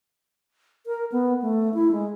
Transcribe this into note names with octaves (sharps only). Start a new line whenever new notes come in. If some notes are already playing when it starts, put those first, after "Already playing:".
A#4
B3
A3
E4
G#3